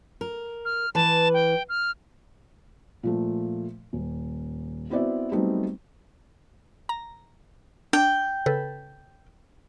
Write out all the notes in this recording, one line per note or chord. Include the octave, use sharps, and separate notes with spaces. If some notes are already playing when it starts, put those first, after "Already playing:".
A#4
F6
E3 B4 A5
G5
F6
A#2 F3 A3
D#1
B3 C4 E4 F#4 D5 E5
F#3 G3 A3 B3 C4 D#4
A#5
D4 G5
C#3 A4 B4